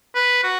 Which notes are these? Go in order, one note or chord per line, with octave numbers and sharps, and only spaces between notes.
B4
F#4